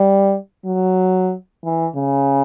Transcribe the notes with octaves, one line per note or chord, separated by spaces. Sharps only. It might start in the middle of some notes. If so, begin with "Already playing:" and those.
Already playing: G3
F#3
E3
C#3